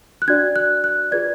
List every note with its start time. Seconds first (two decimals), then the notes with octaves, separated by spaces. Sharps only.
0.22 F#6
0.28 D4 F#4 D5 G#6
0.56 F#6
0.84 F#6
1.12 F4 G#4 B4 D5 G#6